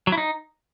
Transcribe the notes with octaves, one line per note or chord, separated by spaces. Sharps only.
F#3
E4
D#4